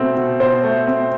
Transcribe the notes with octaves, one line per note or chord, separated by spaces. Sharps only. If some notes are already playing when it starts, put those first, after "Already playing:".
Already playing: B2 A3 C4
B2
B2 C5
A3
C4